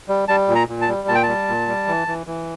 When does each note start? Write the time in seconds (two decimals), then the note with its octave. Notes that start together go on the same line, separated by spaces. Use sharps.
0.09 G3
0.28 G3 A5
0.48 A#2
0.55 A#5
0.69 A#2
0.81 A5
0.89 G3
1.08 A#2 A5
1.15 G5
1.23 G3 A5
1.48 A#2
1.67 G3
1.88 E3
2.08 E3
2.27 E3